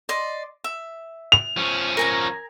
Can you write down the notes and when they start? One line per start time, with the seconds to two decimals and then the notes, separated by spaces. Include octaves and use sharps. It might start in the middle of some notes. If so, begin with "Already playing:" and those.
0.09 D5 D#5 C6
0.64 E5
1.32 F7
1.57 F3 C#4
1.97 A#4 G#5 A#5